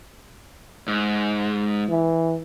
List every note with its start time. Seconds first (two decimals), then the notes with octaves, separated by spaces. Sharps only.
0.88 G#2
1.89 E3